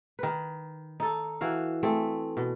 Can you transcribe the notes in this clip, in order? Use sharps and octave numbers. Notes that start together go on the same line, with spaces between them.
D#3 B4
D#4 A4
E3 F#4 F5
A3 C4 G#4
B2